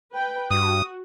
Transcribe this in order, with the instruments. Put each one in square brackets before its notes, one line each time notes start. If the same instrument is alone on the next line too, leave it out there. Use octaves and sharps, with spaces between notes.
[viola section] B4 G5
[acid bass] G2 [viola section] F#4 [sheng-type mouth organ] D#6